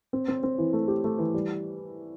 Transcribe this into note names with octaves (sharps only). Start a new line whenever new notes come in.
C4
C4
C4
E3
A3
G4
A3
E3
G3